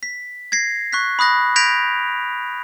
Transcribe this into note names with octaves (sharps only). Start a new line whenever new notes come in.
B6
G#6 A#6 C7
C#6 F#6 B6
B5 D#6 F#6 A#6
G6 G#6 A#6 B6 D7 F7